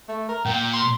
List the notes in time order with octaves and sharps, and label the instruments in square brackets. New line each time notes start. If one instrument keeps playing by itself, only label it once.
[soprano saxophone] A3
A#4
[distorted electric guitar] A#2 [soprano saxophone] G5
[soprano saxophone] C6